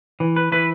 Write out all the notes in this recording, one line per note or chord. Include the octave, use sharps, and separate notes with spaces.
E3
B4
E3 B4